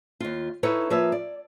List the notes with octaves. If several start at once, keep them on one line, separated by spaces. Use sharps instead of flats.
D#2 F4
D#4 E4 A4 B4 C#5
F3 A#3 B4 C#5 E5
D5